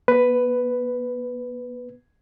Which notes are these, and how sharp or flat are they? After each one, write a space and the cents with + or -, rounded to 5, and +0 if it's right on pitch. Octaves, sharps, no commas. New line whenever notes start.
B3 -40 B4 +5